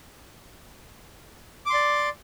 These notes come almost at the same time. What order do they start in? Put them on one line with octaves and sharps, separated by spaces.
D6 C6 D5